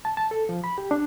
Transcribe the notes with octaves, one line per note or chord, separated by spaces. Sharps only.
A5
A5
A4
F3
B5
G4
D4